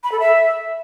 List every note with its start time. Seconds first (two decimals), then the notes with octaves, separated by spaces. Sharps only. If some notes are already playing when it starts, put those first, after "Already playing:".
0.04 B5
0.12 A4
0.20 E5